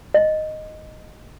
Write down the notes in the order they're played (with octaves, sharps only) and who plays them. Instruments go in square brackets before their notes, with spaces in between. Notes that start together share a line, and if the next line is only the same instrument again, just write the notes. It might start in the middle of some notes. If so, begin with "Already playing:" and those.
[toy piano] D#5